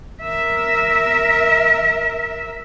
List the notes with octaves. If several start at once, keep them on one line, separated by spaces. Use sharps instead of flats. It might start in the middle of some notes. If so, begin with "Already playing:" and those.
A#4 E5